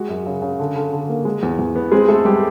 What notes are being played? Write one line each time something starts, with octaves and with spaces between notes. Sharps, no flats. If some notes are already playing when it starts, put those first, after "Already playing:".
Already playing: G#3 F#4
F#2
C#3
C#3
D3
D3
D3
A#3
G#3
E2
E2
B3
G#3 C4 G#4
G#3 A3 A4
G3 G#3 G4